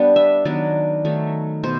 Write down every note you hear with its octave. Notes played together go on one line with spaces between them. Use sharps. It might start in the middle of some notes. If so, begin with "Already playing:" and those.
Already playing: G3 B3 D4
E5
D#3 F#3 B3 D4 D5
D#3 F#3 A3
B2 C5